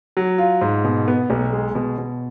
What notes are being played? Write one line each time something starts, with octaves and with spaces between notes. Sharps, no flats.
F#3
F4
G#2
B2
B3
B1
G#3
B2
B2